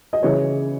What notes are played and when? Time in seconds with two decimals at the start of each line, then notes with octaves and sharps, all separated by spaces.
0.13 D#5
0.23 C#3 E3 C#5